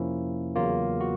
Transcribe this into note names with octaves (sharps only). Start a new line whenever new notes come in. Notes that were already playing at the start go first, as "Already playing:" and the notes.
Already playing: F2 C3 F3 A#3 C#4 E4
E2 C#3 F#3 A#3 F4
F#4